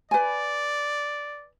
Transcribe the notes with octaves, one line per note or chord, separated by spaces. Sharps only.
B4 D5 G#5